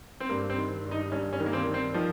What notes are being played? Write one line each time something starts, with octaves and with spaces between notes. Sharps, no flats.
C4
G2 A#3
C4
D#3
G2
D#4
G2 C#4
C#4
D#3
A#3
C4
D#3
C4
D#3 F3